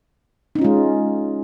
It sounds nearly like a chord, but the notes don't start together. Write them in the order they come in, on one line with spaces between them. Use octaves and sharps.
D#4 C#4 F4 G#3